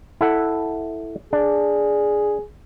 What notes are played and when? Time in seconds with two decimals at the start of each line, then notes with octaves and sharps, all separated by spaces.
0.21 E4 A4 F#5
1.33 D4 G#4